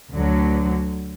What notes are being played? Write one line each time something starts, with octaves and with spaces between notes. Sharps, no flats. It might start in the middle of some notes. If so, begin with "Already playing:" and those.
D2 D3 F#3